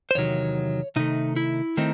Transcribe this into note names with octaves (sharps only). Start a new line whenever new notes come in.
C5
E2 C3 D#3 F#3 C#5
C3 D#3 A3 D#4
E4
D#3 A3 C4 D#4